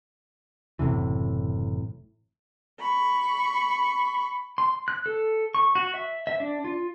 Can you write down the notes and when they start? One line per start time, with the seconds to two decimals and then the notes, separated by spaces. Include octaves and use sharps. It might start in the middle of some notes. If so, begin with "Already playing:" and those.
0.79 F#1 A2 C3 E3
2.79 B5 C#6
4.58 C6
4.88 F#6
5.06 A4
5.55 C#6
5.75 F#4
5.94 E5
6.27 E5
6.40 D4
6.64 F4